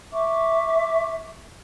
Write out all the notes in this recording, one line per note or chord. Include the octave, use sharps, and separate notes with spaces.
E5 C#6 D6